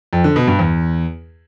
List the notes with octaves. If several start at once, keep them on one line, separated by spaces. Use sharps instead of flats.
F2
D3
B2
G2
E2